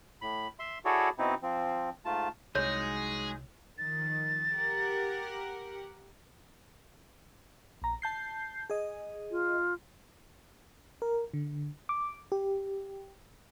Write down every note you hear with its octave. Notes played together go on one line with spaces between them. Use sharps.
A2 B5
E5 C6
E4 F#4 G#4 A4 C#5 D5
B2 C4 D#4 E4
F3 C4
G#2 A3 F4 A5
C2 F#3 G#3 D#4 G#4 C#5
D#3 F3 A6
G4 A#4 F#5
A#1 A#5
A5 G6 C7
G#4 D#5
F4
A#4
D3
D6
G4